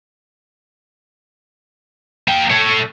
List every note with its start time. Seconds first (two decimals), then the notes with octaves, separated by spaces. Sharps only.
2.28 A#3 G5
2.50 A3 C#5